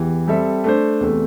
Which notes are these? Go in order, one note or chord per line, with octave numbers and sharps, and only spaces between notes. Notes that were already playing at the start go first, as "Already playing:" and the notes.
Already playing: E2 E3 G4
G3 C4 A4 E5
A3 D4 C5
E2 C3 A3